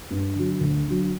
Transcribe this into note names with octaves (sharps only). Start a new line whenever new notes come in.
G2
D3 F#3
D2
D3 F#3